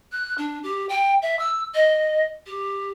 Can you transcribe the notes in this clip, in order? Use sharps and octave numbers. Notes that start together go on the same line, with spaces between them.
F#6
D4
G4
G5
E5
E6
D#5
G4